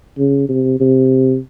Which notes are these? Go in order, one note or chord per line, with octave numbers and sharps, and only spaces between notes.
C#3
C3
C3